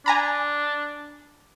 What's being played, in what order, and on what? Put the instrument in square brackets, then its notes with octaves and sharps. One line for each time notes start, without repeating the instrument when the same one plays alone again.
[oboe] D4 [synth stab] G#5 A#5 B5